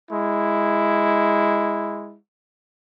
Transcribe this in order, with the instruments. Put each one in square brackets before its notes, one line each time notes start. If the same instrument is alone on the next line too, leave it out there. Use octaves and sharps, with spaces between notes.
[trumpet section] G#3 E4